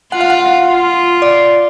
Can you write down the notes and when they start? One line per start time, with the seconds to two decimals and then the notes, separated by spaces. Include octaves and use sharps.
0.12 F4 F#5
0.21 F5
0.30 F#5
0.68 F4
1.22 D5